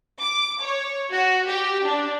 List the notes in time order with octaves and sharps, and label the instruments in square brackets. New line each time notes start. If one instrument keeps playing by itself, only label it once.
[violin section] D6
C#5
F#4
G4
D4